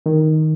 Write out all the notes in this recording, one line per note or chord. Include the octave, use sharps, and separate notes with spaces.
D#3